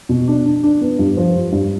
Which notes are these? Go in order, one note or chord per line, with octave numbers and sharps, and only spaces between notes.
B2
D4
D4
D4
B3
G2
F3
G2
G2